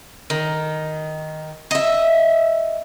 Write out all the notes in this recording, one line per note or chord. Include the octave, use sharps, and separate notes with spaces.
D#3
D#5 E5